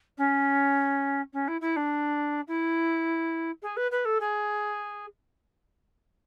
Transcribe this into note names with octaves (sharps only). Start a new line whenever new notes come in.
C#4
C#4
E4
E4
D4
E4
G#4
B4
B4
A4
G#4